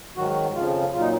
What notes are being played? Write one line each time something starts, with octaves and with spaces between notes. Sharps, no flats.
G#2 D#3 F#3 F#4
F2 C#3 F3 F4
A#2 F#3 F4
D#4